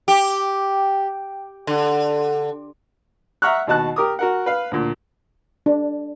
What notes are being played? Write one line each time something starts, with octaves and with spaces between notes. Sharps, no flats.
G4
D3
E5 F#5 A#5 C#6 F6 F#6
D#2 B2 F#4 A5 F#6
G4 A#4 D6 D#6
F#4 A#4 F#5
B4 F5
D2 A#2
D4